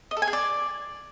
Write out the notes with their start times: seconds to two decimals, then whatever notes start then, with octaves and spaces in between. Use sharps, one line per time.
0.11 D#5
0.17 A4
0.22 G#5
0.28 G#4
0.33 D5